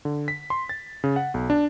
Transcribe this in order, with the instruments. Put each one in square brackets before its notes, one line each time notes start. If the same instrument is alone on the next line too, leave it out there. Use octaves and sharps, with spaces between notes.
[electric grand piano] D3
B6
C6
A6
C#3
F#5
B1
D4